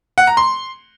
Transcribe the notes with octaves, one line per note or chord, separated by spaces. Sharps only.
F#5
A#5
C6